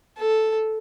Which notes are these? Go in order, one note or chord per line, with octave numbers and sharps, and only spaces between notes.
A4